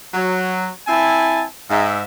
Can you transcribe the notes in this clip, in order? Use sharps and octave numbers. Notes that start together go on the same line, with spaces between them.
F#3
C4 E4 G#5 A5
G#2 E5